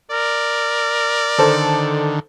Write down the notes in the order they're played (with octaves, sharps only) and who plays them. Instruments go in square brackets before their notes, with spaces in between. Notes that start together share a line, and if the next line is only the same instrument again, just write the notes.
[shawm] A#4 [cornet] D5
[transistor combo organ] D3 D#3 [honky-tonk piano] A4 C5